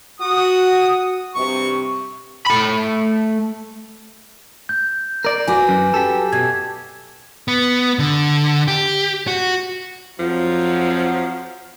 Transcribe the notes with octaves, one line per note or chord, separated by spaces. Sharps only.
F#4 D#6
G2 C3 C#6
A3 B5
G6
A#4 D5
F#4 B4 G#5 D6
F#2
G4 A4
B2 G#6
B3
D3
G4
F#4
F2 F3 F#3